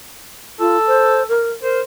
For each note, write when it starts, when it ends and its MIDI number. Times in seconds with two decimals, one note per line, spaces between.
0.60 0.78 65
0.60 1.24 69
0.87 1.23 72
1.29 1.51 70
1.62 1.80 70
1.62 1.80 72